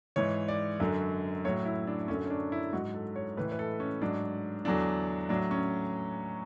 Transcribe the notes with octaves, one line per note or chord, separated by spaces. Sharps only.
G#2 E3 C#5
D5
F#2 D3 F#3
A2 F#3 C#5
E4
D4
F#2 D3 F#3 C#4
C#4
D4
E4
G#2 F#3 F#4
A4
C#5
A2 E3 B4
B4
A4
C#4
G#2 F#3 D4
E2 D3 F#3 D4
A2 F#3 D4
C#4